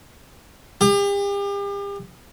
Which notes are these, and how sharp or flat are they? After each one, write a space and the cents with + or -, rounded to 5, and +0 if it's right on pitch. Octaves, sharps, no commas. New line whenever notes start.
G4 +40